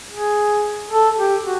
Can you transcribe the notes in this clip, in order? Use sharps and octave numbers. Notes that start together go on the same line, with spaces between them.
G#4
A4
G4
F#4